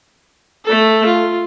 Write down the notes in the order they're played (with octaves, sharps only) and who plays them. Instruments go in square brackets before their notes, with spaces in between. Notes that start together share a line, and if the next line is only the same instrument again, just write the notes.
[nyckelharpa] A3 A4
F4